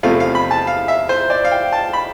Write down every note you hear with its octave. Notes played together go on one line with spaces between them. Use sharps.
E2 C3 F3 A3 F5
F5
B5
A5
F5
E5
C5
D5
F5
G5
A5
B5